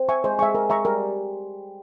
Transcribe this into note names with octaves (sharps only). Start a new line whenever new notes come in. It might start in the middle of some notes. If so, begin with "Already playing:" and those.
Already playing: C4
E5 G#5 C#6
G#3 C5
G#3 E5 G#5 C#6
A#4
E5 A#5 C#6
G3 A#4